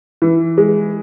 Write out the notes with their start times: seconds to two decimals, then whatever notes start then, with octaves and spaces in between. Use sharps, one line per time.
0.22 E3
0.58 G#3